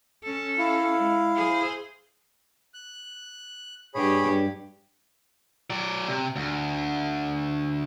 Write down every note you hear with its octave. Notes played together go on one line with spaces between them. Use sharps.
C#4 A4
E4 F5
G#3
G#4 C5
F#6
G2 G4 G#4 C#5 B5
F#3 D5
C3
D2